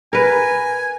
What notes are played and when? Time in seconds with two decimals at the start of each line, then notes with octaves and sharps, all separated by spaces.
0.13 A#4 B4 G#5